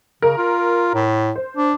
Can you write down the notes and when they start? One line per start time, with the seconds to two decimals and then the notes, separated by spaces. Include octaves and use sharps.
0.22 C#3 A#4
0.38 F4
0.94 A2
1.36 C5
1.57 D4